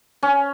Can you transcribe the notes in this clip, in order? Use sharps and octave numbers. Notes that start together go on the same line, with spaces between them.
C#4